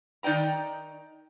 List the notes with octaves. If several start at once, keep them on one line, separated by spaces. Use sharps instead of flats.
D#3 D#4 D5 G5 A#5